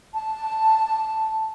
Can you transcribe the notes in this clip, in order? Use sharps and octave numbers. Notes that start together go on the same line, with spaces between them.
A5